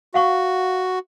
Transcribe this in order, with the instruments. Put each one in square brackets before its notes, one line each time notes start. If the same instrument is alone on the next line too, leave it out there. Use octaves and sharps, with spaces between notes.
[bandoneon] F#4 [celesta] F5 F#5 C#6